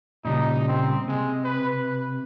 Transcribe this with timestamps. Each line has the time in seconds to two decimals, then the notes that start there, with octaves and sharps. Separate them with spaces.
0.25 A#2 C#3 G3 D#4
0.68 C4
1.08 C3 G#3
1.45 B4